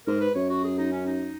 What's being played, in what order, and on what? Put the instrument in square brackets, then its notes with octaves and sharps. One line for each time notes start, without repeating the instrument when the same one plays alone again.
[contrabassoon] G#2 [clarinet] A#4
[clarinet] B4
[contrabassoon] F#2 [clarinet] C#5
[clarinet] F#4
G#4
D#4
C#4
D#4